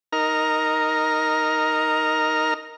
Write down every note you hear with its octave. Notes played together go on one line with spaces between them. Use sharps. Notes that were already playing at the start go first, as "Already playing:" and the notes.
D#4 A#4 A#5 F6